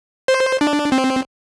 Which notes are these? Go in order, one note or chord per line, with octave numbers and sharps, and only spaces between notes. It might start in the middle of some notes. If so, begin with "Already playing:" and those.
C5
D4
C4